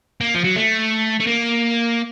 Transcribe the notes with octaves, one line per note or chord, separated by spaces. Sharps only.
A#3
F3
F#3
A3
A3
A#3